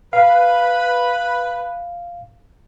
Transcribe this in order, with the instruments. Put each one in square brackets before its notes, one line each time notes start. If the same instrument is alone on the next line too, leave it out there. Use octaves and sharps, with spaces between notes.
[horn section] B4 [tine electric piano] F5